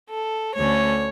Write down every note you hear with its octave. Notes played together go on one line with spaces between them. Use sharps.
A4
D2 D3 A3 C#4 C#5